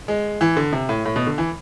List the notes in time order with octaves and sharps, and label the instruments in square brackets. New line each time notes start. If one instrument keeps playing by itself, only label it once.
[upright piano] G#3
E3
D3
C3
A2
A2
B2
D3
E3